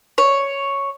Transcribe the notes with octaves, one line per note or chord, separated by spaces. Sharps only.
C#5